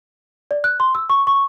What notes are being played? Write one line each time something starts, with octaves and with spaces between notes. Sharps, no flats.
D5
F#6
C6
E6
C#6
C#6